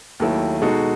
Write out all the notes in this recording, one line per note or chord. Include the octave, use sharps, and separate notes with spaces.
D#2 D#3 F#3 A3 E4
B2 G#3 D#4 F#4 A4